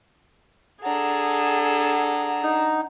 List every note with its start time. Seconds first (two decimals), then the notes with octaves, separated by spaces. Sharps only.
0.83 D4 G#4 A4 F#5 A#5
2.43 D#4